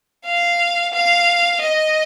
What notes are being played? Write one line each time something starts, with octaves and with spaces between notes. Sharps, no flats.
F5
F5
D#5